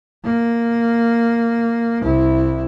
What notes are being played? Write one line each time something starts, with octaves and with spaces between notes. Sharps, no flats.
A#3
C2 E4